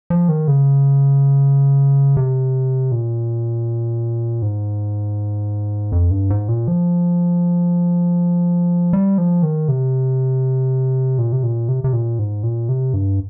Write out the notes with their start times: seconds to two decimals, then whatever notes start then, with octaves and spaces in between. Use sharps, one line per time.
0.10 F3
0.29 D#3
0.48 C#3
2.17 C3
2.92 A#2
4.42 G#2
5.92 F2
6.11 G2
6.30 G#2
6.49 A#2
6.68 F3
8.93 G3
9.18 F3
9.43 D#3
9.68 C3
11.18 A#2
11.32 C3
11.43 A#2
11.68 C3
11.84 C3
11.93 A#2
12.19 G#2
12.43 A#2
12.69 C3
12.94 G2